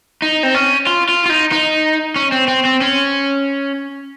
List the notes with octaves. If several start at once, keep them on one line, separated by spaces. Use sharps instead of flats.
D#4
C4
C#4
F4
F4
F4
D#4
D#4
C#4
C4
C4
C4
C#4